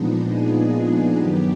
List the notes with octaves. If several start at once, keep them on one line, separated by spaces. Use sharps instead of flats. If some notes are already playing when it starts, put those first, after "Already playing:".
Already playing: A#2 F3 G#3 B3 D4 D#4
G#4
G#4
G2 D#3 F#3 B3 G4